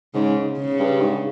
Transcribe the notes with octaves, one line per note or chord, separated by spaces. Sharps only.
G#2 C#3
C#3
G2
G#2